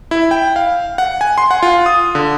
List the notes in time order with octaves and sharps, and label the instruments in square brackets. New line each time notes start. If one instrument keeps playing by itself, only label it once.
[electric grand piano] E4
G5
F5
F#5
G#5
C6
F#5
F4
D#6
D3